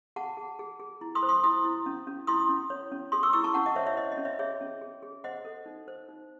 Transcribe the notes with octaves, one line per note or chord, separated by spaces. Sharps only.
G#4 F#5 A5
G#4
G#4
G#4
E4
C6 D#6
C5
C6 D#6
E4 C6 D#6
E4
C#4
C#4
E4 C6 D#6
C#4
C#5
C#4
G#4 C6 D#6
C#6 E6
E4 C#6 E6
A5 C#6
C#4 F#5 A5
D#5 F#5
C5 C#5 E5
C#5 E5
C5 D#5
D#5
C#4
C#5 E5
G#4 C#5 E5
C#4
G#4
G#4
C5 D#5 F#5
A4
D#4
C5
D#4